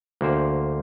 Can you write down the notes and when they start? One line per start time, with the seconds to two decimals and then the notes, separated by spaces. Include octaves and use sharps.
0.21 D2 A#3 C5